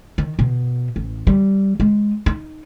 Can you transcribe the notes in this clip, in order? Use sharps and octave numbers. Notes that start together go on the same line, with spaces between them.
D#3
B2
A1
G3
G#3
D#4